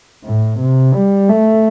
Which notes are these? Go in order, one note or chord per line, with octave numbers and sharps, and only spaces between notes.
A2
C3
G3
A3